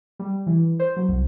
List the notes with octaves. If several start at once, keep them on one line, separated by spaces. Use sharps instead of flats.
G3
E3
C5
F#3
C2